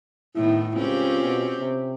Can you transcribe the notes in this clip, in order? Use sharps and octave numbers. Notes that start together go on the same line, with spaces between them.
A2 D#3 B3 E4
C#2 C4 C#4 F4 G4
B2
C3